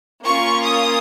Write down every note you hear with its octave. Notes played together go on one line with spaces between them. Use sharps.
A#3 C#4 F4 C#6
D#6